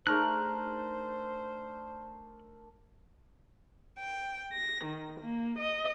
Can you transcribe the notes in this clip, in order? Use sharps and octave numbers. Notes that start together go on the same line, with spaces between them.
A3 D4 D#4 G#4 A#4 C5 F6 F#6
G5
A#6
D#3
A#3
D#5